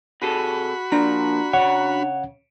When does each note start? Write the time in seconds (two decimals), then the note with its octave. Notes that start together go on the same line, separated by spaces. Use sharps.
0.22 C3 F#4 G#4 A4 B5
0.92 F3 A#3 D4 A#5
1.53 C#3 C#5 F#5